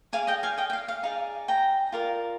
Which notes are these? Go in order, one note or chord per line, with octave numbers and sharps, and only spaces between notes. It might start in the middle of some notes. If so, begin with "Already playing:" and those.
G#4 D5 F5 G#5
D#5 G5
F5 G#5
D#5 G5
G5
F5
F5
D#4 G#4 D5 F5
G5 A#5
F4 A#4 D5